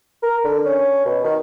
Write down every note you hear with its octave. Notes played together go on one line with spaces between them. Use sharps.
A#4
D3
C#4
B2
D#3